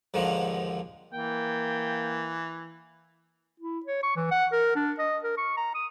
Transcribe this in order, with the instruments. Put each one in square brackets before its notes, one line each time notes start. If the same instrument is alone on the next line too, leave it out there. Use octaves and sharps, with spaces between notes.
[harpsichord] D#2 G#2 D3 D#3 F3
[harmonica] E3 [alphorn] A#3 [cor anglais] G5
[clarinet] E4
C#5
C#6
E3
F#5
A#4
D4
D#5
A#4
C#6
A#5
D#6